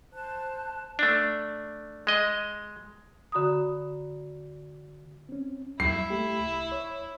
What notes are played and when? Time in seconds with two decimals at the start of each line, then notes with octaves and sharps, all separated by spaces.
0.12 C5 A5 F#6
0.99 A3 D4
2.07 G#3 D#5
3.32 D3 F#4 A#5 B5 D#6
5.29 C4 C#4
5.80 F#2 G3 E4 C7
6.10 A3 G4
6.39 C2
6.72 C#5